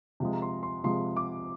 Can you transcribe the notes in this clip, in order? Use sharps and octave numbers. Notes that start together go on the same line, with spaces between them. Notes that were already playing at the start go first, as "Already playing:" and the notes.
C3 F3 G#3
A#5
C6
C6
C3 F3 G#3 C6
D6